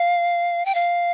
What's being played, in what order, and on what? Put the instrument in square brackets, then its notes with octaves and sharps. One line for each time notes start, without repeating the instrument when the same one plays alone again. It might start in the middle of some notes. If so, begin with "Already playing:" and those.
Already playing: [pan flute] F5
G5
F5